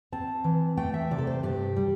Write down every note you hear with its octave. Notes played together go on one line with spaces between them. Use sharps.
C4 A5
E3
A3 G5
E5
C3 D5
A4
C5
G2 G4
G3